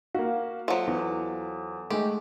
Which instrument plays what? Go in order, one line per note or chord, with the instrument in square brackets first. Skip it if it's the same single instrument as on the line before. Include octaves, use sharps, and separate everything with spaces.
[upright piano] A#3 F#4 [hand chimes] F5
[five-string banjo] F3 F#3 [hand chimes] A4 F#5
[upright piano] E2
[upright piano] G#3 A3 [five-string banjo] G4